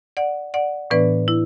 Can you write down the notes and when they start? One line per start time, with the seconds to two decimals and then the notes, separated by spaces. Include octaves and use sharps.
0.17 D5 F#5
0.54 D5 F#5
0.90 A2 E3 B3 D4 B4 D5
1.28 E4